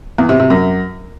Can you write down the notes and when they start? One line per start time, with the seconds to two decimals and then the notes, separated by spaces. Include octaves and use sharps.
0.18 E2
0.29 C3
0.40 C3
0.50 F#2